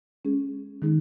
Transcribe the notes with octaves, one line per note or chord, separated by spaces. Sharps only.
G#3 C#4 G#4
D#3 G#3 D#4 G#4